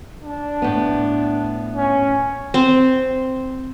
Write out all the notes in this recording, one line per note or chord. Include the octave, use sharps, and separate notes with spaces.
D4
A2 B3
C#4
C4